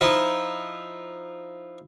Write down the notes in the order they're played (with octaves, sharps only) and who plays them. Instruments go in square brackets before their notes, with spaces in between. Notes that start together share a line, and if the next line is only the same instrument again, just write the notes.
[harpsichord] F3 D#4 E4